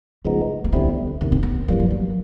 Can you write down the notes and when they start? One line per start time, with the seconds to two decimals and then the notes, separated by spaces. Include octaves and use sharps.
0.25 C#3 F3 G#3 A3 B3 D#4
0.64 A#3
0.72 D2 D3 G3 B3 C4 E4
1.21 E2 C3 D#3 B3
1.32 C4
1.43 B3
1.68 G2 E3 F#3 G3 A#3
1.79 F3
1.90 F#3